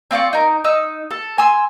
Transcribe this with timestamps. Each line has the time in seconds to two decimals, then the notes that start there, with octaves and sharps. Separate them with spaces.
0.11 C4 F4 D5 C#6
0.33 D#4 A#4
0.64 D#4 E6
1.11 A4
1.38 G#5 C6 E6